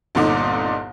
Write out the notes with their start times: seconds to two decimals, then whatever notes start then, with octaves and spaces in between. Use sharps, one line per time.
0.15 G1 C2 A#2 D3 D#4 D6